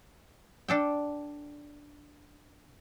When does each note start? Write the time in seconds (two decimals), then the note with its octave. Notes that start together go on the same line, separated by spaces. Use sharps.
0.68 D4 A4 G5